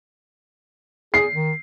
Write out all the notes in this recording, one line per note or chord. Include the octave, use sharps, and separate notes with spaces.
G#4 C7
D#3